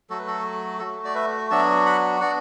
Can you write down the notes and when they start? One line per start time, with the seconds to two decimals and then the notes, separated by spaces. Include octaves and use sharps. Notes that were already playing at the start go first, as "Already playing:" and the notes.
0.10 F#3 A3 F#4 A4
0.19 B4
0.27 A4
0.80 A3 F#4 A4
1.05 D5
1.15 B4 E5
1.50 F#3 B3 D4 F#4 E5 A5
1.86 F#5 B5
2.21 B3 D4 F#4 D5 F#5